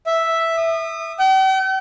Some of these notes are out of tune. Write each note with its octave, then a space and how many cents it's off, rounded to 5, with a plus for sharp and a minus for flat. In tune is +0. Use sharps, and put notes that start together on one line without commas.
E5 +0
D#6 -30
G5 -45